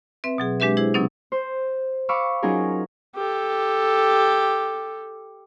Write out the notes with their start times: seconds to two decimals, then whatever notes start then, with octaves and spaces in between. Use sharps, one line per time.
0.24 C4 B4 E5
0.38 B2 F#3 G#4
0.60 G#3 D4 G4 B4 E5
0.77 E4 G#4 C5
0.94 C3 F#3 B3 C#4 D#4
1.32 C5
2.09 F5 B5 C#6 D6 E6
2.43 F#3 C#4 D#4 F4 G#4 A#4
3.16 G4 A4